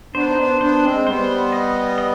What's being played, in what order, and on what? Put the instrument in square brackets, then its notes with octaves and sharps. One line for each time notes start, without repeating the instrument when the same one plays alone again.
[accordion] B3 D4 [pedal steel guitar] C5
[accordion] D#4
B3 D4
[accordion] B3 D4 [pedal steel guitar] C5
[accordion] G#3 C4
[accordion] G3 B3 [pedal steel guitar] C5
[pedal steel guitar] D#5
D#5